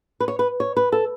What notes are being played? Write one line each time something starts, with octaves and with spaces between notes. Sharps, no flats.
B4
C#5
B4
C#5
B4
A4